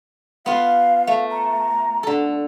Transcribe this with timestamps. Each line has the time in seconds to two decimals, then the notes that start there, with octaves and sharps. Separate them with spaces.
0.46 B3 F4 F5
1.07 A3
1.31 A#5
2.03 D3 A4